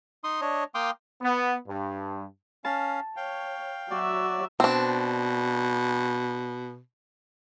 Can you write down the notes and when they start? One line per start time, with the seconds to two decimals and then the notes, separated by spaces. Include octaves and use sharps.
0.24 D#4 C6 D#6
0.41 D4 C#5 D#5
0.75 A#3 F5 G5 C6 D6 D#6
1.22 B3
1.67 G2
2.65 C#4 F5 A5
3.17 C#5 F5 G5
3.91 F#3 F#4 D5 E5
4.60 B2 C4 D4